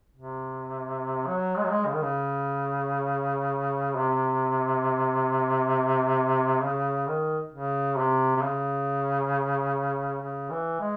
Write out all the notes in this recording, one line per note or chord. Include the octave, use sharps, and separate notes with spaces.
C3
F#3
G#3
F#3
G#3
C#3
D#3
C#3
C3
C#3
D#3
C#3
C3
C3
C#3
C#3
E3
G#3